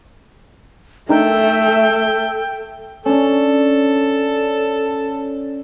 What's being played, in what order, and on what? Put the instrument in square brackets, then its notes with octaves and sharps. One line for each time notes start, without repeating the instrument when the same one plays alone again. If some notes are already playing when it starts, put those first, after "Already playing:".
[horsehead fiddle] A3 E5 [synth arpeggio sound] D4 D#4 A#4 [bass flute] A4 [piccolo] G5
[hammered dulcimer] C#4 D4 [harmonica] A4